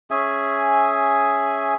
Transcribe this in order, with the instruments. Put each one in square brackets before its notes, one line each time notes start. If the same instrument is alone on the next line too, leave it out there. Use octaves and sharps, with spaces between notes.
[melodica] C#4 G#4 E5 G#5